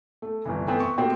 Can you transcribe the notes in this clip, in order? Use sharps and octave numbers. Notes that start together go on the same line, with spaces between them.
A3
G1 C2 E3
E3 A3 B3 C4 B4
C#6
A2 A#3 C4 F#4 G4